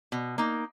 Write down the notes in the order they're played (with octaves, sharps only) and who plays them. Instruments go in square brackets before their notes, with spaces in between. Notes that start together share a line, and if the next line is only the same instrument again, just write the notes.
[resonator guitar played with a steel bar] B2
A#3 D#4